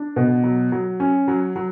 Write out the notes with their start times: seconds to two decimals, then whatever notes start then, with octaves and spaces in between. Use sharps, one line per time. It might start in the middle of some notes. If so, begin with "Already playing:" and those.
Already playing: D4
0.16 B2
0.44 F#3
0.72 F#3
1.00 C#4
1.28 F#3
1.56 F#3